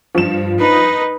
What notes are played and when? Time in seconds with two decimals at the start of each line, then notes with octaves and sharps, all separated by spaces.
0.15 G2 F3 E7
0.59 D#4 B4